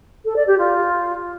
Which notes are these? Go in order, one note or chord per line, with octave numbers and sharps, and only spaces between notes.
A4
D5
G4
F4